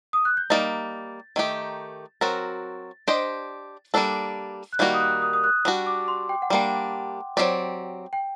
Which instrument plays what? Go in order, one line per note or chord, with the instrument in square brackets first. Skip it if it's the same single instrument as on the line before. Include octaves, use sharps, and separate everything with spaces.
[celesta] D#6
F#6
G6
[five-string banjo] G3 A#3 D#4 [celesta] A6
[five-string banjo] D#3 A3 D#4 G4
[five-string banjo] F#3 C4 F#4 A#4 [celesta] A6
[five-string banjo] D4 G4 C5 D#5
G3 A#3 D4 A4
[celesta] F#6
[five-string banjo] D#3 G3 A#3 F#4 [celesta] G6
[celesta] D#6
F#6
D#6
D#6
F#6
[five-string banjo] G3 D4 F#4
[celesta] D6
C6
G5
F#5
[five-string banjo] G3 A#3 D4 [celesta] G5
[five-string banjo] F#3 A3 C4 G4 D5
[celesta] G5